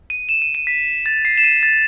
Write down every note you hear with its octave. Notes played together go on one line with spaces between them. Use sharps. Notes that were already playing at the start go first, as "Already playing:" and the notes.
D#7
E7
D#7
D#7
B6
A6
C7
E7
D#7
A6